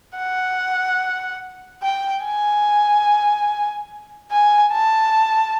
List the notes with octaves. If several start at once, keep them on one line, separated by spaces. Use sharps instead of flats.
F#5
G5
G#5
G#5
A5